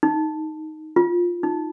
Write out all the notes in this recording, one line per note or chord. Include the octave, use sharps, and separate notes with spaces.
D#4
F4
D#4